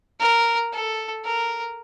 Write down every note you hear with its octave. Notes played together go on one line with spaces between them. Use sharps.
A#4
A4
A#4